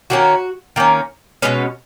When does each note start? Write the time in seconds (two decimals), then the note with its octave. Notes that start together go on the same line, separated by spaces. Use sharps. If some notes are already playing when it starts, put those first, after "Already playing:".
0.10 D#3 A#3 C#4 F#4
0.76 D#3 A#3 C#4
1.42 B2 G#3 C#4 B4